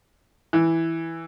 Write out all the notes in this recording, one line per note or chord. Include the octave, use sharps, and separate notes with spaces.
E3